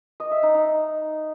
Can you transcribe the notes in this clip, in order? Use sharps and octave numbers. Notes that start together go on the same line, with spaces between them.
D#5
E5
D#4
D#4